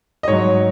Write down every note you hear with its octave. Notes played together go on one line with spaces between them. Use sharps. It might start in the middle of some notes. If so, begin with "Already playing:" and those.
D#5
G#2 F#3 C#5